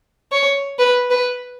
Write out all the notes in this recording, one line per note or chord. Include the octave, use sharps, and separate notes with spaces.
C#5
B4
B4